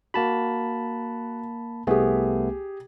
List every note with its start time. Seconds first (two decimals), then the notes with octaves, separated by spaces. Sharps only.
0.14 A#3 F#4 A5 B5
1.87 C2 A3 B3 G4 G#4